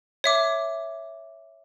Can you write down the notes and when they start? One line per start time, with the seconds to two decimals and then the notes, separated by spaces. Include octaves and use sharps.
0.24 C#5 E5 D6